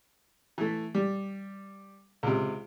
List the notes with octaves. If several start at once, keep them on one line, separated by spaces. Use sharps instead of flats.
E3 A3
G3
C#2 C3